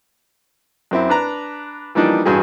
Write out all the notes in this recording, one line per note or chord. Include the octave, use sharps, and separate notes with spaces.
F#2 C4 E4
D4 B4 A#5
E3 F3 G3 A#3 D4 D#4
A1 G2 F#4 G#4